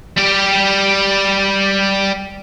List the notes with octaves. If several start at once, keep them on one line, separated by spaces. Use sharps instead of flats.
G3 G4